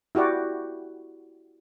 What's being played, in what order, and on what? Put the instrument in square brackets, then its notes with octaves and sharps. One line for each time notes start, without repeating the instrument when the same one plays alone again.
[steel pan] E4 F#4 G4 D5